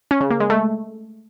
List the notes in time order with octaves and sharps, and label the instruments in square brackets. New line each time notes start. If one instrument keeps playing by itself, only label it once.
[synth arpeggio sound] C#4
C#3
A#3
G#3
A3